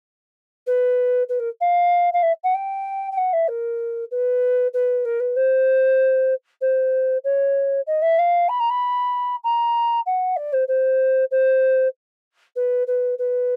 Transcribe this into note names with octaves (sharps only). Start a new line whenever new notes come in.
B4
B4
A#4
F5
F5
E5
F#5
G5
G5
F#5
E5
A#4
B4
B4
A#4
B4
C5
C5
C#5
D#5
E5
F5
B5
A#5
B5
A#5
F#5
D5
C5
C5
C5
B4
B4
B4